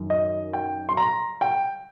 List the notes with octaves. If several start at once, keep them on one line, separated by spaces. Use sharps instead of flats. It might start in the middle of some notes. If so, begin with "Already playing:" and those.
Already playing: F#2 D#3
D#5
G5
C6
A#5
G5